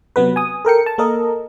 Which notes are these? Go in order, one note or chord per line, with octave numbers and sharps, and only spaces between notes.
C3 F#3 B3 B4
G#5 D#6
A4 A#4 G5 C#7
A5
A#3 A4 A#4 D#5